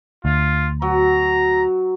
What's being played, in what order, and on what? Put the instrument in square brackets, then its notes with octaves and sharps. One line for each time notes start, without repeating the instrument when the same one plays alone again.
[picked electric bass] D2 [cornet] F4
[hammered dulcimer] F#3 [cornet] A#5